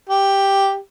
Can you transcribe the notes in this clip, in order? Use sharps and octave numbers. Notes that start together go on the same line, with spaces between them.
G4